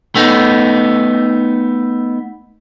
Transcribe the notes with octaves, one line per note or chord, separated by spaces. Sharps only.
A3 B3 D#4